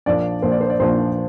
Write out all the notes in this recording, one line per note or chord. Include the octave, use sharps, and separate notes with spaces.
A#1 A#2 F3 D4 D5
A#1 A#2 F3 D4 C5
D5
C5
D5
A#1 A#2 F3 D4 C5